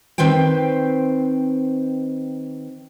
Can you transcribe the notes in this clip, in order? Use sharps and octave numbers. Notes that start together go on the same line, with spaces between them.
D#3 C4 B4 C5 G5